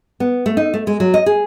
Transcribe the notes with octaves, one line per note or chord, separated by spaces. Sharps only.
B3
A3
D#4
A3
G#3
F#3
D#5
G#4